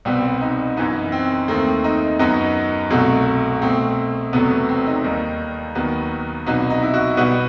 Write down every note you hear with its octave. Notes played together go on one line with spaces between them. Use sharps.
C2 B2 G3 B3 C4
D#4
F#2 E3 B3 D#4
C4
D#2 D#3 A3 C4
D#4
F#2 F#3 B3 D#4
C2 B2 F#3 A3
B2 A3 C4
E2 C3 F#3 A3 B3
B3
C4
D#4
D#2 D#3 G3
D#2 D#3 F#3 B3
C2 B2 F#3 B3 D#4
D#4
E4
F#4
B2 G3 B3 F#4